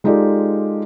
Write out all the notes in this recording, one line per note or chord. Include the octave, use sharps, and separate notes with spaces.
G#3 D#4 F4 G4 A4 D5